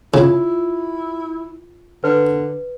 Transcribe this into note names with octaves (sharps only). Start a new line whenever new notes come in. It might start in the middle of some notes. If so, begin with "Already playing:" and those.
C#3 E4 F4
D3 B4